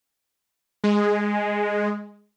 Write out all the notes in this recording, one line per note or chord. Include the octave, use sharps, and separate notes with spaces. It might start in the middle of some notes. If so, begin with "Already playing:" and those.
G#3